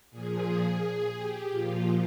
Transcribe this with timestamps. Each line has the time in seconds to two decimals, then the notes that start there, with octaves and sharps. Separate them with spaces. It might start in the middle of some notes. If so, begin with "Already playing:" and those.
0.11 A#2 F3 G#4
1.16 G4
1.50 A#2 F3 F4